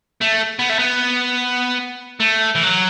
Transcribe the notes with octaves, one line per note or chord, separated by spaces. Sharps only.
A3
B3
A3
B3
A3
E3
F#3